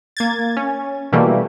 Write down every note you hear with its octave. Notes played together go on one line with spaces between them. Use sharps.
A#3 G#6 A6
C#4
B2 E3 G3 A3 A#3